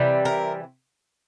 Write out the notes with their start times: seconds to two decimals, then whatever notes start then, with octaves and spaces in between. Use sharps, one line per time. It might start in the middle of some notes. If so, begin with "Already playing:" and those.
Already playing: C3 E3 G3
0.25 A#4